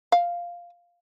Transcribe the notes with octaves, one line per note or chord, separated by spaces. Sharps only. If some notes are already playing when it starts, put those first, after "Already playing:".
F5